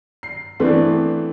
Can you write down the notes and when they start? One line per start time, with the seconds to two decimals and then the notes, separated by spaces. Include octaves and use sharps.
0.23 C7
0.60 E3 A3 B3 C4 D4